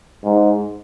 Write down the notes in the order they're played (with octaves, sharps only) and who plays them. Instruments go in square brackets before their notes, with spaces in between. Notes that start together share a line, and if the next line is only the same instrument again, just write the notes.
[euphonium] G#2